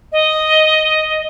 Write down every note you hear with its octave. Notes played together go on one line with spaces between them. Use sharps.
D#5